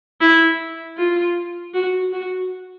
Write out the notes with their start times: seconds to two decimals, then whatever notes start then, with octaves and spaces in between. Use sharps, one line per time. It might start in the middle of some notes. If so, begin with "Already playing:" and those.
0.21 E4
0.98 F4
1.74 F#4
2.13 F#4